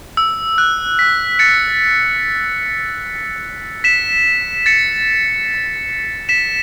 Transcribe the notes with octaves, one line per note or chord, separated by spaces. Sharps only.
E6
F#6
B6
A6 C#7
B6 E7
A6 C#7
B6 E7